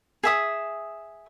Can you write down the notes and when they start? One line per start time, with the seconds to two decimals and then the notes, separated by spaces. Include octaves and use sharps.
0.23 G#4 E5 D#6